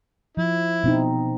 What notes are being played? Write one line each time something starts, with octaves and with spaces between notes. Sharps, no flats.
F3 E4
B2 C4 D#4